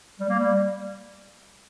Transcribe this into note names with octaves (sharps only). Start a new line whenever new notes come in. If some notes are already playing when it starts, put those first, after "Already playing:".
G3
A#3
G3